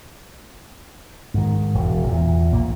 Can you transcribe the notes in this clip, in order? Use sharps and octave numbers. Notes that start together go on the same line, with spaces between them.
G#2 D#3
E1
E2 A#2
A#1 A#2 A#3